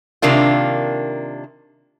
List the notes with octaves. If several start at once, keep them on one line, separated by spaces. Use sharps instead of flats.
C3 D#3 A#3 D4 F4